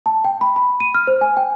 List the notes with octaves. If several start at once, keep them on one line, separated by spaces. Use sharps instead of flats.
A5
G5
B5
B5
D#7
F6
C5
G#5
G5